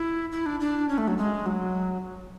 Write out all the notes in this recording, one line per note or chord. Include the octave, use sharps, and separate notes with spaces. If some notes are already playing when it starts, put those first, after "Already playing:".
Already playing: E4
E4
D4
D4
C#4
A3
F#3
G#3
F#3